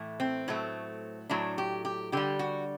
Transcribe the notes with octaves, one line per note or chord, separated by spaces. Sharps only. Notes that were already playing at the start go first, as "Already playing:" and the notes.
Already playing: A2 E3 A3
C4
A2 F#3 A3
A2 F#3 A3 D4
G4
G4
D3 G3 G4
F#4